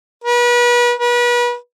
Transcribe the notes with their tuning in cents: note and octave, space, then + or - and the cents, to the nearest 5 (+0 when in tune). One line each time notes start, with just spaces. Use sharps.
B4 -35
B4 -35